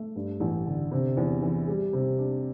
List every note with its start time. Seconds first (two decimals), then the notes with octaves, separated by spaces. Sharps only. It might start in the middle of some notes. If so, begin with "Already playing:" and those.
Already playing: A3
0.16 G2
0.40 A1
0.66 D3
0.91 C3
1.17 E2
1.42 E3
1.68 G3
1.93 C3
2.18 D4